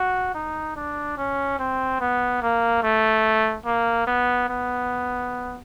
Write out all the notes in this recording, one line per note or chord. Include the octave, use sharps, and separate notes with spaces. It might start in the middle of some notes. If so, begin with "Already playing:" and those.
Already playing: F#4
D#4
D4
C#4
C4
B3
A#3
A3
A#3
B3
B3